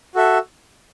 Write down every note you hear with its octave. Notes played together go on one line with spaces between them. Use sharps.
F#4 A4 E5